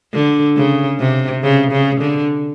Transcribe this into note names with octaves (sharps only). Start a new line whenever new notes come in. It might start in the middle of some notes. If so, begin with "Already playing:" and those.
D3
C#3
C3
C#3
C#3
D3